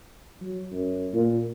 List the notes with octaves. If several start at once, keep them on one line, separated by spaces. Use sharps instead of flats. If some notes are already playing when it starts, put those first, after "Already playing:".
F#3
F#2
A#2